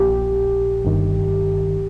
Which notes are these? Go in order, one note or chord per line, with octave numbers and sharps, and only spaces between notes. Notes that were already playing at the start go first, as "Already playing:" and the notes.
Already playing: A#1 A#2 G4
G1 G2 D#3